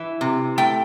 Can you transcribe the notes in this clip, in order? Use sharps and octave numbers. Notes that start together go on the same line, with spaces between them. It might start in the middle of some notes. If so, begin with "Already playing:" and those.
Already playing: E3 E5
C3
A3 G5